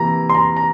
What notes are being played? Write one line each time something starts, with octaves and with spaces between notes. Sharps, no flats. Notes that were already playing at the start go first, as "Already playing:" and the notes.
Already playing: C3 E3 A#3 A#5
C6
A#5
A#5